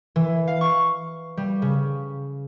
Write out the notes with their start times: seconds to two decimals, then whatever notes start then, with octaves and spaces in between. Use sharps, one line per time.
0.16 E3
0.48 F5
0.61 C#6
1.37 G3
1.62 C#3